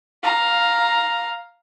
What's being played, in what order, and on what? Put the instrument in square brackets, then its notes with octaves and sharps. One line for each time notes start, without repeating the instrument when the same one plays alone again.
[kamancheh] F5 A#5